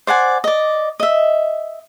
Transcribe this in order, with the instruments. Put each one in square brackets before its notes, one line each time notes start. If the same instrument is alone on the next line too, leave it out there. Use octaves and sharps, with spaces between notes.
[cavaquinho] C5 D5 F#5 G#5
D5 D#5
D#5 E5